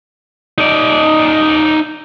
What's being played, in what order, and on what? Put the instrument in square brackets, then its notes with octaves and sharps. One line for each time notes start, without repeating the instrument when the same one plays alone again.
[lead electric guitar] D#4 D5